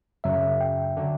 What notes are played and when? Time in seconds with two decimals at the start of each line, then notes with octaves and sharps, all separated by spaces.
0.24 F#2 C#3 F#3 E5
0.43 E5
0.61 G5
0.97 D3 F#3